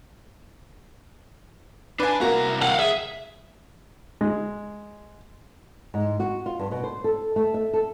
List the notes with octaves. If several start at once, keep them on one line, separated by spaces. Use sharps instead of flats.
D4 B4 G#5
C2 A#3 F#4 A#5
F5 F#5
G#4 E5
G#3
G#2
F#4
F4
G2
B2
C5
A4
A3
E5
A4